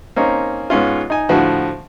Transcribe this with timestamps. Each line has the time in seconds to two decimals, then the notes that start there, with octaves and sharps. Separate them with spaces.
0.16 A#3 C4 C#4 D#4
0.70 G#2 B3 C#4 F4
1.10 D#4 G#5
1.29 A2 D3 F3 F#4